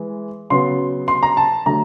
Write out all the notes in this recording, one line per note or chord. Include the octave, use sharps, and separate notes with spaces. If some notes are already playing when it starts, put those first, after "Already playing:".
Already playing: E3 G#3
C#3 F#3 B3 C6
C6
A#5
A5
D3 F#3 A3 A#5